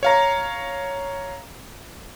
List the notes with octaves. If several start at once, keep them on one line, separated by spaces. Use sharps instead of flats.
C#5 F5 A#5